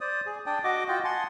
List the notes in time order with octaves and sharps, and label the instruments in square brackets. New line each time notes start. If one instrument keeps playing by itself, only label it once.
[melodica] C5 D5 D#6
G#4
D4 D5 G5 D#6
F#4 D#5 D6
F4 F#4 D#5 G5
F#5 G#5 A5 C6